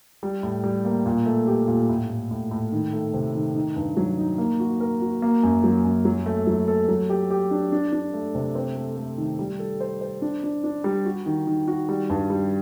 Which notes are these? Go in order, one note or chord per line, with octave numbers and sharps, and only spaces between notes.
G3
A2
G3
A#3
A#2
A3
G4
A#2
A2
A2
A2
A2
D#3
A3
C3
D#3
D#4
G2
F#3
D#4
A#3
F#4
A#4
F#4
A#3
F#2
F#3
F#2
F#3
A3
F#3
A4
F#3
G4
G4
D4
D4
D4
A3
C3
C4
A3
A3
D#3
G3
A4
C5
C5
D4
D4
D4
G3
F#4
D#3
D#3
F#4
G3
G2
G3